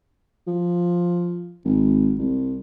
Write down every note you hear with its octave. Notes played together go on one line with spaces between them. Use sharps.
F3
G#1
C2